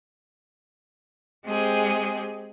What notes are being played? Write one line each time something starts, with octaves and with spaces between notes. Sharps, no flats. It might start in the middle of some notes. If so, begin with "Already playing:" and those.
G#3 C4 G4 G#4